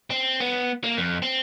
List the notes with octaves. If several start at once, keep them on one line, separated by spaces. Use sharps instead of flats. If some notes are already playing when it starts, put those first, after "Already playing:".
C4
B3
A#3
F2
C4